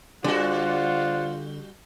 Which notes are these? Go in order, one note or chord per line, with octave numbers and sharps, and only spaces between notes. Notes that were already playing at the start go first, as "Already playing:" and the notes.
D3 G3 F4 F#4 C5 D5 F#5